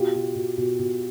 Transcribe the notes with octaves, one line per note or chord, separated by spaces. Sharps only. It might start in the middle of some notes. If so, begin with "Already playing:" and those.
Already playing: B2 F4 G4
B2
B2
B2
B2